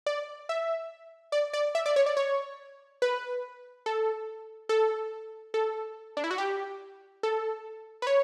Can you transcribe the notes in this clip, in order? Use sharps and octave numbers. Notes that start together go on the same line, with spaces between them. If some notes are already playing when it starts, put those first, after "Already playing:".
D5
E5
D5
D5
E5
D5
C#5
D5
C#5
B4
A4
A4
A4
D4
E4
F#4
G4
A4
B4
C#5